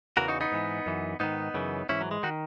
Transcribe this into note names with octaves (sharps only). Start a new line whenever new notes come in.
E2 C#3 E3 F#4 A#4
D#4 F#4
B3 D#4
G#2 E3
F#2 E3
G#2 D#3 B3 D#4
F#2 C#3 E3
G#2 E3 C#4 E4
F#3
G#3
D#3 D#4 F#4